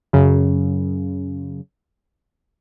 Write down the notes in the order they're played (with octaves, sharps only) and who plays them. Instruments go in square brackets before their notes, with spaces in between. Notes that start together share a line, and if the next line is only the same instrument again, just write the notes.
[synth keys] F#2 C#3